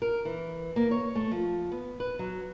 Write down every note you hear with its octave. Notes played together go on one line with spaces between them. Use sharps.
A#4
E3
A#3
C#5
A3
F3
B3
B4
F#3